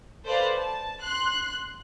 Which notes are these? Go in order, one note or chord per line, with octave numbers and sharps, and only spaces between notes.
A4 B4 C5 D5 F5
A5
C6 F#6